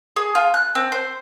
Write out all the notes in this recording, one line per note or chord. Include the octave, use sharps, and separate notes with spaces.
G#4
F4
F#6
C4
C5